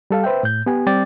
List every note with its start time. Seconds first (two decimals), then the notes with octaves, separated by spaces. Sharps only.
0.10 G3 A4 F5
0.24 B4 C5 E5 G5
0.43 A2 G6
0.66 B3 G4 G#5
0.87 G3 C4 D5 G5 D6 A6